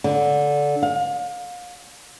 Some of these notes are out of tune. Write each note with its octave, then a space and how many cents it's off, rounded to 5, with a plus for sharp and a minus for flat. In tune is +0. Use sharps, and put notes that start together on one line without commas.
D3 -15
F5 +35